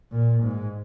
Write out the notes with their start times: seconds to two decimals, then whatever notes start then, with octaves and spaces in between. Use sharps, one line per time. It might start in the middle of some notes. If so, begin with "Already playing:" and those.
0.12 A#2
0.43 G#2